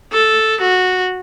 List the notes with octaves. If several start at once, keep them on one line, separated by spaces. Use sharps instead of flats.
A4
F#4